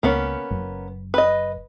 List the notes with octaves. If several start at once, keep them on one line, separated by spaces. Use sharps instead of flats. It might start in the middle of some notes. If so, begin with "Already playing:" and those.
C#2 A#3 B3 C#4
F#1
B4 D#5